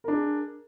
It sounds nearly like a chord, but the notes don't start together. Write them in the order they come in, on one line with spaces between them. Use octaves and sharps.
A#4 D4 G#4